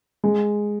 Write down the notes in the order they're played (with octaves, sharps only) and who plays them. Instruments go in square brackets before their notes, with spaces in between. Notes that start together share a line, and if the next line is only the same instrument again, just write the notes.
[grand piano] G#3